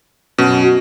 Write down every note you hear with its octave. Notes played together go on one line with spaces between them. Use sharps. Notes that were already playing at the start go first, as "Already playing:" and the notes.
F#2 B2
F#4